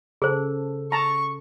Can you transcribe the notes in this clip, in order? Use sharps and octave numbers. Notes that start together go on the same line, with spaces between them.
C#3 G#4 A4 C5
A5 A#5 C#6